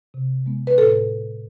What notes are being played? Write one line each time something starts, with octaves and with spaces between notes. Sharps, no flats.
C3
G#3 B3
B4
A2 A4